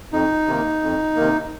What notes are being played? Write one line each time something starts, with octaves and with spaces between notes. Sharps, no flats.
F2 D#4
C3 D#3 A#3
F2
C3 D#3 A#3